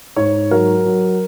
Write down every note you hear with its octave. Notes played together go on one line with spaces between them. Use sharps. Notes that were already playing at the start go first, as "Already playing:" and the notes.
G#2 C#5
F#3 A#4
F#3